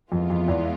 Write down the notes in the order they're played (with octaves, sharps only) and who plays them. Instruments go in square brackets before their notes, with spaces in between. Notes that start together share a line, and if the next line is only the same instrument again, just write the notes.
[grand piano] F2 [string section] E3 G#3 B3 F4
[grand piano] F2
E2